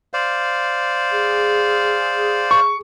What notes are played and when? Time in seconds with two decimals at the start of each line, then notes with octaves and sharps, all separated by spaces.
0.13 C5 D5 F5
1.12 G#4
2.51 C#6